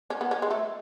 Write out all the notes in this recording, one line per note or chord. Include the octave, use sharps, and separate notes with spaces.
C#4
B3
C#4
G#3
A3